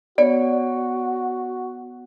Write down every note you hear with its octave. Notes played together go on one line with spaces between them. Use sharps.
B3 F#4 C#5 D5